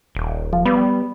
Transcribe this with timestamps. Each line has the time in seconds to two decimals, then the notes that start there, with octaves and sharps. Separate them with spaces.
0.15 D#1
0.53 F3
0.66 G3 B3